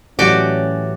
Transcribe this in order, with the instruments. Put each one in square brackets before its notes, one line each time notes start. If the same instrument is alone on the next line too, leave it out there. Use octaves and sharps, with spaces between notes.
[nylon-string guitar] A2 E3 F#3 [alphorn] C#4 [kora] F#4 [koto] G4 D5